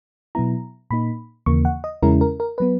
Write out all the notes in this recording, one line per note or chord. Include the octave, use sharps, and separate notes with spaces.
B2 F#3 B3 E4 A#5
A#2 A#3 D#4 B5
D#2 C#3 E3 A#3 C#6
F#5
D#5
E2 C#3 G#3 C#4 E4 A#4
A#4
A#4
F#3 B3 B4